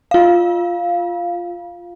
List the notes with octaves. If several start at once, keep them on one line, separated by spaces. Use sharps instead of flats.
F4 F5